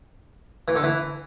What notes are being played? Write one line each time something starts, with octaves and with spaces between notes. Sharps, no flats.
E3
D3
E3